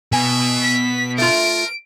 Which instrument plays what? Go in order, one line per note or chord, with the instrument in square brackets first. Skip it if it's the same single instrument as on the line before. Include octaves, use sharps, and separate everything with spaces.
[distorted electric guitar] B2 [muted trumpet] E5 [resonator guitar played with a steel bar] G#5
[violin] B6
[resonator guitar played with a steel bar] A3 F4 [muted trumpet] A#4 [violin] D7